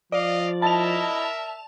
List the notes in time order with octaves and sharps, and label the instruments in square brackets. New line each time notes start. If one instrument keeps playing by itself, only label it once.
[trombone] F3 [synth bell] D5 [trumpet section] D#5 F5
[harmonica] E4 D#5 B5 [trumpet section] A#4 E5 [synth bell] A5 F7